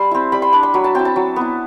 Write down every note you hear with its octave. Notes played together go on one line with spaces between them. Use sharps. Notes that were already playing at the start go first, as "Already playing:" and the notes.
Already playing: G3 A5 C6
C4 E4
G3 B5
C6
D4 B5
C6
F#3 B5
A5
C4 E4 G5
A5
F#3
B3 E4